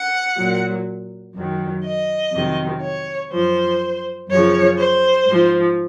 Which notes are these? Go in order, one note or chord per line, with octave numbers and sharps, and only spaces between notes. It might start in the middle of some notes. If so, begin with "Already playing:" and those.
Already playing: F#5
A#2 F#3
F#2 D#3 F#3
D#5
F2 C3 D#3 F#3
C#5
F#2 F3 C5
F#2 C#3 F3 C#5
C5
G#2 F3